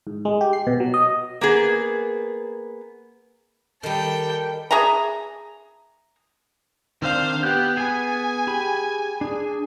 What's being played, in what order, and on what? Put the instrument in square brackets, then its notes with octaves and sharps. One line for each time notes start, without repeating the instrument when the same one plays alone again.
[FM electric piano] G#2
G#3
G4
C7
B2
F#3
D#5
[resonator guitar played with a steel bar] A#3 B3 G#4
[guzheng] D#3 G3 [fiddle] A4 G5
[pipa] G#4 E5 G#5 A#5
[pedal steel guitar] D#3 C4 D4 [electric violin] C5 F5
[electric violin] B3 G4 [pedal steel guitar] F#6 G6
[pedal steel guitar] B3 G#4 [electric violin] G#5
[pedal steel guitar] G4 G#4 B5
D4 G#4